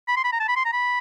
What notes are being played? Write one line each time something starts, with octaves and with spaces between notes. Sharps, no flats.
B5
C6
B5
A#5
A5
B5
C6
A#5
B5